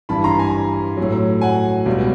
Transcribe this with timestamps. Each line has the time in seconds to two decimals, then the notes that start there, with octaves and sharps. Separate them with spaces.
0.09 G2 E3 G3 A5 B5
0.24 A#5 C6
0.39 G#5 A#5
0.97 A2 F#3
1.41 F#5 G#5
1.86 C#2 B2 G3